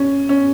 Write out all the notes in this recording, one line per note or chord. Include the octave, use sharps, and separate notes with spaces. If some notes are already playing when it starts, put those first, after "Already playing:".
Already playing: C#4
C#4